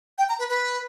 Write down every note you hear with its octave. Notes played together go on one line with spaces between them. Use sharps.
G5
A#5
B4
B4